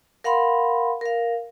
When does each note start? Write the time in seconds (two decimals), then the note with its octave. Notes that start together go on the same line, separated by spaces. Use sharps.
0.24 A#4 F5 F#5 B5 C6
1.01 A#4 F5